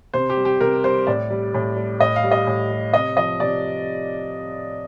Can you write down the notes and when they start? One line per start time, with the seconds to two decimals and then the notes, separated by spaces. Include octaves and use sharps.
0.13 C3 C5
0.30 G4
0.37 G3
0.45 G4
0.61 C3 A#4
0.84 G3 C5
1.07 A2 D5
1.30 G3
1.54 A2
1.76 G3
2.00 A2 D#5
2.16 F5
2.24 G3
2.31 D#5
2.47 A2
2.70 G3
2.93 C3 D#5
3.17 F3 D#5
3.40 C3 D5